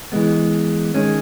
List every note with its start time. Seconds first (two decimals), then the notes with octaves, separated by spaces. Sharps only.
0.12 E3 G#3 B3
0.94 D#3 G#3 C#4